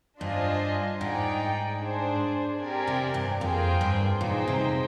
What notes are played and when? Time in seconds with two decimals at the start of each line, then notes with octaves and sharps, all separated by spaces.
0.20 G2 D4 F4 C5 D#5 G#5
1.01 G#2 D#4 G#4 D5 G5
1.81 D4 G#4 C5
2.61 C4 G4 A#4 D5 G#5
2.87 C3
3.14 G2
3.41 F2 A#3 F4 G#4 C5 G5
3.81 G2
4.21 A#2 D#4 G#4 C5 G5
4.48 C3